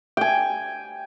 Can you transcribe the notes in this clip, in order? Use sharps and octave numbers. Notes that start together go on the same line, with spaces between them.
G5 G#5